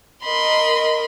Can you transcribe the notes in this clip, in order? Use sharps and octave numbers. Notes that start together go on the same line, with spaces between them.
A#4 D#5 B5 C6